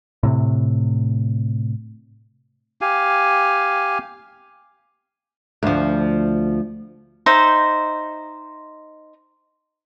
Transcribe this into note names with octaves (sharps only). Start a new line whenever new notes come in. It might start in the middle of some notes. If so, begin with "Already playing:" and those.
A2 C3
G4 F5 G#5
D2 F3
D#4 C5 E5